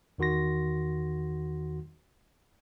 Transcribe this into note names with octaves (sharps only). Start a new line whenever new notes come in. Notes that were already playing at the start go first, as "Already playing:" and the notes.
E2 D#3 F#4 C6 A#6